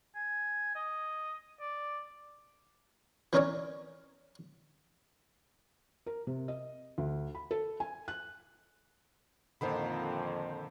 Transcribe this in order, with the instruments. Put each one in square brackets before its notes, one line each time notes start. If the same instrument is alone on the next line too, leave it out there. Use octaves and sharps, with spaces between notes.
[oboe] G#5
D#5
D5
[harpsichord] E3 C#4 D#4 A#4 C#5 D5
[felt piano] A#4
C3
D#5
D2
B5
A4
G#5
F#6
[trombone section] F2 [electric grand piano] A#2 C5 B5 [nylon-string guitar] D3 D#3 F3